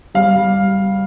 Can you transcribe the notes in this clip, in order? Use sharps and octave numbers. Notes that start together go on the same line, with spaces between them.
G3 F5
G3